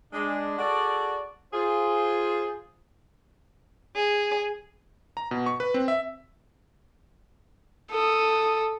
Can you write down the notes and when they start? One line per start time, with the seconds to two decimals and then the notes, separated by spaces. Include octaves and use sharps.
0.13 G#3 D4
0.58 F#4 G#4 A4 D5
1.53 F4 G#4 C5
3.96 G#4
5.17 A#5
5.31 B2
5.46 C#6
5.60 B4
5.74 C4
5.88 E5
7.91 A4 D#6